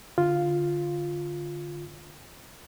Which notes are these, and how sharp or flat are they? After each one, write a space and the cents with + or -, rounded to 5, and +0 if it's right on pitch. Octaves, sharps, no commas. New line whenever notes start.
D3 +0 F4 +0